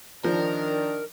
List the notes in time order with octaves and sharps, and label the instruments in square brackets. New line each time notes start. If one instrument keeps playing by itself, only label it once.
[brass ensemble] D#3 D4 [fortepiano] F3 [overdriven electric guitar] A#4